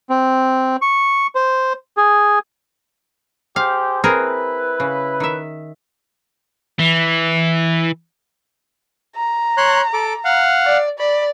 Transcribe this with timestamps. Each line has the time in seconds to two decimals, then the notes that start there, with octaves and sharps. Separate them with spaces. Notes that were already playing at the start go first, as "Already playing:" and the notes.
0.10 C4
0.82 C#6
1.35 C5
1.97 G#4
3.56 G4 G#4 C5 F5
4.04 C4 E4 G#4 A#4 B4
4.80 C#3
5.20 D#3 E5
6.79 E3
9.16 A#5
9.57 C#5 C6 F#6
9.93 A4 D6
10.25 F5 F#5
10.66 D5
10.99 D5 B5